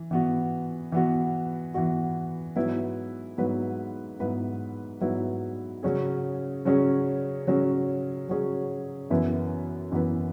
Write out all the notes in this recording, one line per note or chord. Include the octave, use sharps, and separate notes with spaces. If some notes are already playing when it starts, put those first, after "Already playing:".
Already playing: E3
E3 B3 F#4
E3 B3 F#4
E3 B3 F#4
G#2 F#3 B3 E4 B4
G#2 F#3 B3 E4 B4
G#2 F#3 B3 E4 B4
G#2 F#3 B3 E4 B4
C#3 F#3 C#4 G#4
C#3 F#3 C#4 G#4
C#3 F#3 C#4 G#4
C#3 F#3 C#4 G#4
F#2 E3 B3 E4 B4
F#2 E3 B3 E4 B4